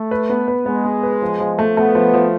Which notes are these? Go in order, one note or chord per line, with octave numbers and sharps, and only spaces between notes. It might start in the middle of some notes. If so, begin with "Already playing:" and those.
Already playing: A3
B4
B3
B4
G#3 B3
B3
B4
F3
F3
A3
A3 B3
F3
F3